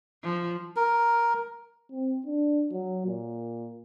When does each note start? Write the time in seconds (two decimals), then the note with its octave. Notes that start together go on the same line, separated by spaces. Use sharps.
0.23 F3
0.76 A#4
1.91 C4
2.26 D4
2.73 F#3
3.06 A#2